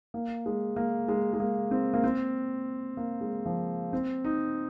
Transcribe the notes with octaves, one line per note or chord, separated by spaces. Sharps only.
A#3
G#3
A#3
G#3
G#3
A#3
C4
A#3
C4
A#3
G#3
F3
C4
D#4